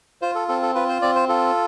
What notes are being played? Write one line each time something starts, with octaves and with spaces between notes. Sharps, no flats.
F4 C5
A4
C4 A4
A4
F4 B4
C5
C4 D5
C5
F4 A4